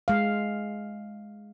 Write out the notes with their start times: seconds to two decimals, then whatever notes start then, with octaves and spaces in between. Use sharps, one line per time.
0.08 G#3 F5